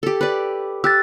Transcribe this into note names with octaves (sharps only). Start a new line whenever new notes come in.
G4 A4
B4 D5
G4 E6 F#6 A6